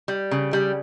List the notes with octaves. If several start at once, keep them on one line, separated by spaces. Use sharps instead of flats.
G3
C#3
G3